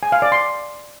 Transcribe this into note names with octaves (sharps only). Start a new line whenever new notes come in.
G#5
F5
D5
C6